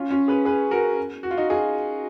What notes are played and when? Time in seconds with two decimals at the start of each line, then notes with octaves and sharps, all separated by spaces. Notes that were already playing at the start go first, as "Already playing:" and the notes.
Already playing: C#4 F4
0.10 C#4 F4
0.28 G#4 B4
0.45 G#4 B4
0.71 F#4 A#4
1.23 F#4
1.31 F4
1.37 D#4 F#4
1.50 F4 G#4